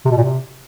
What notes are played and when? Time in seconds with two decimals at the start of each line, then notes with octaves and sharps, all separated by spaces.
0.05 C3
0.11 B2
0.17 A#2
0.23 C3